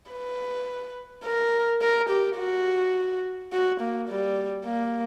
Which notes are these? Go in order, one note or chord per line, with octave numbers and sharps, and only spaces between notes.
B4
A#4
A#4
G4
F#4
F#4
A#3
G3
A#3